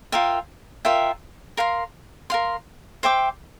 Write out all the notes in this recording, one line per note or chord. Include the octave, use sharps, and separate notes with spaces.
F4 A#4 E5 G5
F4 A#4 E5 G5
A#4 F5 C6
A#4 F5 C6
C5 E5 G5 D6